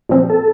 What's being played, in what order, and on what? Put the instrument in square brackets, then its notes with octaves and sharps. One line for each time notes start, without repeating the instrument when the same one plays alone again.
[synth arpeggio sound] A#2 F3 C4
[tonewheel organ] A4